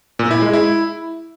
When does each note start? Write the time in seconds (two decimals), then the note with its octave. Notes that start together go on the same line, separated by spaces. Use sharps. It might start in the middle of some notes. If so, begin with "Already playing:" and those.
0.19 A#2
0.31 E4
0.42 G#3
0.53 E4